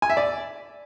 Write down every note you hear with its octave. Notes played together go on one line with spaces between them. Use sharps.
G#5
E5
D5